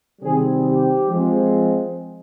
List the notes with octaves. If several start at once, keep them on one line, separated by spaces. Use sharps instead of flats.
C3 D#3 G3 C4 G#4
G4
F3 G#3 C4